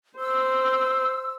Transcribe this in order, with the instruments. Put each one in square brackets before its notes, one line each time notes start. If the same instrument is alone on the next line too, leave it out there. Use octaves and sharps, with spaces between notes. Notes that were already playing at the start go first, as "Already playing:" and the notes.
[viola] C5 [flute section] E6